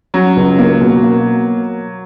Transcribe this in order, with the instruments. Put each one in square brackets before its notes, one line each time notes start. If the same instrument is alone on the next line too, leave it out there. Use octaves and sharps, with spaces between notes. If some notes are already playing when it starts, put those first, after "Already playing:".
[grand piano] F#3 [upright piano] C#4
[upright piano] C#2
A#3
B2
A#3